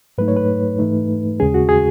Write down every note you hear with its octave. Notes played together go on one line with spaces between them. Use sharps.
G#2 F#3 A3 D#4 B4
C#5
B4
G#2 E3 A3 D#4
D#2 C#3 G#3 C#4 G#4
F#4
G#4